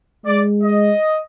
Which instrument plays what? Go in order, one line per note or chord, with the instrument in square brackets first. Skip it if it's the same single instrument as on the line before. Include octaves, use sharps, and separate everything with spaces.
[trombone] G#3 [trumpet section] D5
[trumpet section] D#5